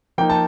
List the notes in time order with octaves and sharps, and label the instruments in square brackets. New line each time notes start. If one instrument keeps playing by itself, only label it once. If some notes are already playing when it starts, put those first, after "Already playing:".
[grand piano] F3 A#3 D#4 G5
A5